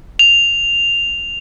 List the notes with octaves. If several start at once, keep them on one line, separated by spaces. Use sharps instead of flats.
F7